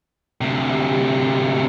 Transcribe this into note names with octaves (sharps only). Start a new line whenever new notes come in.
D2 C3